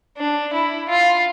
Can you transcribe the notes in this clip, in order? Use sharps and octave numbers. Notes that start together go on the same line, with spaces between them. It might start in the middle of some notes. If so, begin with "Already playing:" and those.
D4
E4
F4